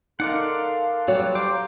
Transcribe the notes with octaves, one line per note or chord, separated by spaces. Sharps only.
D#4 A4 A#4 D5 F5 F#5 C6
F#3 G3 F#4 C#5 D5
C5 F5 G5 A#5 D6